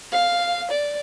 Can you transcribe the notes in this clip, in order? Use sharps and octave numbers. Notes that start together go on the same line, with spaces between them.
F5
D5